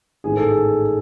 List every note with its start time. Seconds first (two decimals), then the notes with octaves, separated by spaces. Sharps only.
0.24 A1 G#2 D#3 G#4
0.37 A4
0.49 G#4